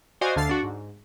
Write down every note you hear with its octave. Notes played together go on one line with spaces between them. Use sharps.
F#4 C5 D5 D#5 F5 G#5
D2 D3 F5 A6 C7
D4 F#4
G#2